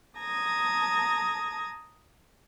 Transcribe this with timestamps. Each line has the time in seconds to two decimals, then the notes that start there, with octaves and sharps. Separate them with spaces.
0.17 A5 A#5 D#6 G#6 A#6